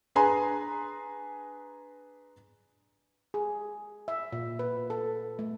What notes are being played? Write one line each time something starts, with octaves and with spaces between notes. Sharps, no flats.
D4 G#4 B4 G#5 A#5 C6
G#4
E5
A#2
B4
A4
A3